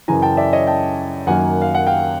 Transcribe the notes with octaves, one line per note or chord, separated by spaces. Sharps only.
F#2 C#3 E3 G#5 A#5
G5 A5
D5 E5
C#5 D#5
G5 A5
F#2 D#3 F#3 A#3 F#5 G#5
F5
F#5
F5 G5